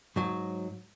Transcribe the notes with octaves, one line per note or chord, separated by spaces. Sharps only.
G#2 F#3